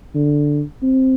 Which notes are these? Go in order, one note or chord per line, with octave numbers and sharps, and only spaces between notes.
D3
C4